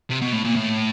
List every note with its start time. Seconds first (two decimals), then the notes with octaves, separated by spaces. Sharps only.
0.10 C3
0.22 B2
0.33 A2
0.45 A#2
0.56 A2